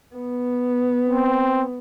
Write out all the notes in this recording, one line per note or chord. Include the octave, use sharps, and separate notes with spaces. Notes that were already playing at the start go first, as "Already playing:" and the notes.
B3
C4